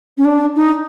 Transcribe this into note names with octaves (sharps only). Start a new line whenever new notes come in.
C#4
D4
D#4